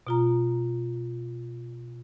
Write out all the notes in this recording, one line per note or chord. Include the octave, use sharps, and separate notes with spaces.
B2 F4 A#5